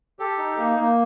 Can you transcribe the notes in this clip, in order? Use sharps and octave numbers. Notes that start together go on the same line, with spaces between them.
G4 A4
D#4
A#3
A#3